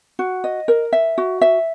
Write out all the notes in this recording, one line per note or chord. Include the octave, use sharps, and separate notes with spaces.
F#4
D#5
A#4
E5
F#4
E5